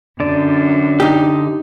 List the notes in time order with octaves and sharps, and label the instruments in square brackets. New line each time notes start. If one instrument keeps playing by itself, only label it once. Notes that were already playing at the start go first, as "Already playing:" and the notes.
[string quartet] F#2 [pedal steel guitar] D3 D5
[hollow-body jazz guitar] D#4 G4